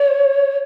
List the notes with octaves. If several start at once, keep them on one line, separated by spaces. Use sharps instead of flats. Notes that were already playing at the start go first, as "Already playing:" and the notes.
Already playing: C#5